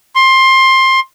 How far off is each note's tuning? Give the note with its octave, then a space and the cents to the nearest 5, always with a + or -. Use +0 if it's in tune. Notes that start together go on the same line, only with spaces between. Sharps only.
C6 +20